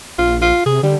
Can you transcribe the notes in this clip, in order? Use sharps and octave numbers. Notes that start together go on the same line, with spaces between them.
A#1 F4
F4
C3 G#4
D3 G3